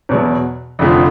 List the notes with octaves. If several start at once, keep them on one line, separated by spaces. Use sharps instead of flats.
E2 B2 F#3
F1 F2 D3 F3